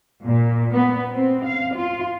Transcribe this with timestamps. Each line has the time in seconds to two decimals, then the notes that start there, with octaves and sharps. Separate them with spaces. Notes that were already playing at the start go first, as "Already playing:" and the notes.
0.24 A#2
0.72 B3
1.13 C4
1.45 F5
1.75 F4